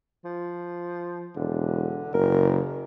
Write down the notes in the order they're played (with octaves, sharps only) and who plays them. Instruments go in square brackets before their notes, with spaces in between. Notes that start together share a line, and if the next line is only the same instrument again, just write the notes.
[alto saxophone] F3
[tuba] E1 [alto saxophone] D3
[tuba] F#1 [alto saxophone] A#4